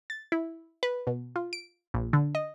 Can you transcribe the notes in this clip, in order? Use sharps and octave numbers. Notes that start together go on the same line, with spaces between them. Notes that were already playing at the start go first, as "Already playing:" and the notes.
A6
E4
B4
B2
F4
D7
A#1
D3
D#5